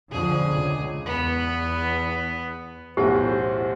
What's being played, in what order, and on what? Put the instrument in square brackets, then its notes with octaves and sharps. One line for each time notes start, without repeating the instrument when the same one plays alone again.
[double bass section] F2 D3 [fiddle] G#4
[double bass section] C#2
[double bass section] E2 [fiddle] B3
[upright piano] B1 E2 A2 [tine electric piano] E4 F#5 [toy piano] G4 [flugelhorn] C5